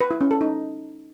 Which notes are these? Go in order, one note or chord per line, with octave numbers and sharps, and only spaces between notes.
B4
E4
C#4
A4
D#4